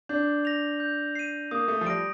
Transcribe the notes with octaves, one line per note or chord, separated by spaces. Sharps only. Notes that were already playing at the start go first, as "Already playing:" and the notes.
D4 G6
A#6 F7
G6
C7 D#7
A#3 D#6
A3
F3
G3 A#6 D7